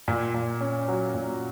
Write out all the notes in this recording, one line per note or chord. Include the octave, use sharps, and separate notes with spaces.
A#2
A#2
C#4
F#3
A#2